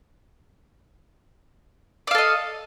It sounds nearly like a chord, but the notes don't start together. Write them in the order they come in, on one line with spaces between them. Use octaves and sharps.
D5 F5 A4 D#5